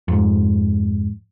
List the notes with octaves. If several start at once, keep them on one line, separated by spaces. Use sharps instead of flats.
F2 G#2